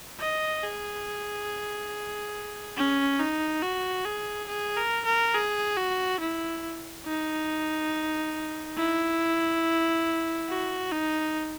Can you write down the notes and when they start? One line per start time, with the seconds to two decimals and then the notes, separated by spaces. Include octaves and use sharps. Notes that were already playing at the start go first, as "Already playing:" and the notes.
0.20 D#5
0.63 G#4
2.76 C#4
3.20 D#4
3.62 F#4
4.05 G#4
4.48 G#4
4.77 A#4
5.06 A#4
5.34 G#4
5.77 F#4
6.20 E4
7.06 D#4
8.77 E4
10.49 F#4
10.92 D#4